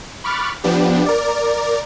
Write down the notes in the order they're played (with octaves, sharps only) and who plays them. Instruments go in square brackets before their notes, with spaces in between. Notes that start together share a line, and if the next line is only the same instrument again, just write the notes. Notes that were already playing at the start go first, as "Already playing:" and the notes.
[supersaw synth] B5 C#6 D6 F6 F#6 A6
F3 B3 D4 G4
A#4 D5